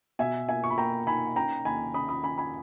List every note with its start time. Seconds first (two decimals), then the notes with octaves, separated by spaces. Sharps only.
0.19 B2 E5 G#5
0.48 A#3 E5 G#5
0.64 C#6
0.70 B5
0.77 A#3 G5 A#5
1.07 D#4 G#5 B5
1.36 C#4 G5 A#5
1.65 D#2 G#5 B5
1.94 C#4 B5 D#6
2.09 B5 D#6
2.24 C#4 G#5 B5
2.38 G#5 B5